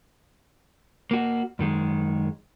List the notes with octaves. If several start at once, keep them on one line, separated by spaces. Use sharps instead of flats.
A#3 F#4
F#2 D#3 G#3